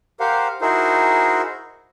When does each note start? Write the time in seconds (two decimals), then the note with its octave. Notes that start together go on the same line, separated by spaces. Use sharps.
0.20 G4 A#4 C5 F5 F#5
0.61 D#4 E4 F#4 G#4 A#4 C5